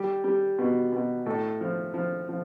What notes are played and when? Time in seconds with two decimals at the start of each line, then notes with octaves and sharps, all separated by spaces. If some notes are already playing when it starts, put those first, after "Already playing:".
Already playing: G3 G4
0.24 G3
0.59 B2
0.92 B2
1.26 A2 A4
1.61 F3
1.94 F3
2.29 F3